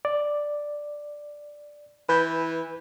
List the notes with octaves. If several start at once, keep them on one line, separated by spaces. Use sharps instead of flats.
D5
E3 B4 G6